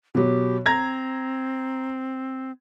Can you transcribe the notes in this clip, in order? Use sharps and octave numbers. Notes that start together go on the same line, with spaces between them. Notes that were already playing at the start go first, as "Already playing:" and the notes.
B2 F#3 G4
C4 A#5 G#6 A#6